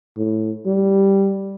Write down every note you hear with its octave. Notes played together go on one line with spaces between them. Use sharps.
A2
G3